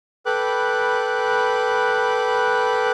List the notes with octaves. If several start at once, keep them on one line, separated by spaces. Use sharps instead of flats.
A4 B4 G5 B5 D6 F#6